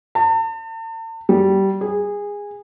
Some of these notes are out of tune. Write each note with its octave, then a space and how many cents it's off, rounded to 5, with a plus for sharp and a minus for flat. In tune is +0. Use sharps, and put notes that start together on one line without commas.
A5 +40
G3 -20
G#4 -20